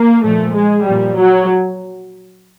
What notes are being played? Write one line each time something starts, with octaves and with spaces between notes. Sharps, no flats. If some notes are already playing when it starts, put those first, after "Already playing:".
Already playing: A#3
A#2 F3 A3
G#3
A#2 F3 G3
F#3